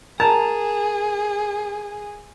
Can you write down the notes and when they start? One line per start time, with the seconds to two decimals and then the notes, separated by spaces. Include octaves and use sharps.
0.20 G#4 A#4 A5